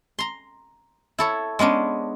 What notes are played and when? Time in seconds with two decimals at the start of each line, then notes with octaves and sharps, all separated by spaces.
0.19 A#5 C6
1.18 E4 A4 C#5
1.59 G#3 B3 C#4 D4